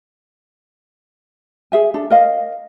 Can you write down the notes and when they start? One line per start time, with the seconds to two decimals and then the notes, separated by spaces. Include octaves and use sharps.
1.72 G#4 E5 G#5
1.94 D4 A4
2.10 A#4 D#5 F5